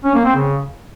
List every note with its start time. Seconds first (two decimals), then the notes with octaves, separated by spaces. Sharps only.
0.05 C#4
0.15 A#3
0.25 C4
0.36 C#3